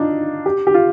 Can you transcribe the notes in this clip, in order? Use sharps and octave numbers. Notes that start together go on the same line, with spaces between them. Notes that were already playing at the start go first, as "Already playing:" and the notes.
Already playing: D4 D#4 F4
G4
G4
F4